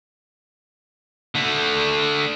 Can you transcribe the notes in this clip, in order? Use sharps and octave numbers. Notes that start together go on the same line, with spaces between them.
D3 A3